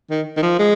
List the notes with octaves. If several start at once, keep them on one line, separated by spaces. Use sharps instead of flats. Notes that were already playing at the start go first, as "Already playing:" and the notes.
D#3
D#3
F3
G#3